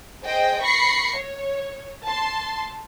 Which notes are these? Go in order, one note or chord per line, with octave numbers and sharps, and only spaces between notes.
G#4 C5 D#5 G5
B5 C#6 A#6 C7 C#7
C#5
A5 C6